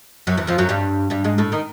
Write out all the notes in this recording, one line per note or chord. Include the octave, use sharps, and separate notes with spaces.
F#2 F#3
E2 E3
F2 F3
F#2 F#3
G2 G3
G2 G3
G#2 G#3
A2 A3
D#3 D#4